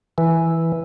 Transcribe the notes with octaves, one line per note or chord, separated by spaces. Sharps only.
E3